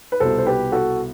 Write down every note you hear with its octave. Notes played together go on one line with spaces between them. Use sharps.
B4
C2 B2 A4 C5
C5
G4 B4
F#4 A4